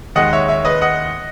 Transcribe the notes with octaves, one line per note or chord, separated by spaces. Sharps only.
D#2 D#3 G#3 D#5 F#5
C#5 E5
C#5 E5
B4 D#5
D#5 F#5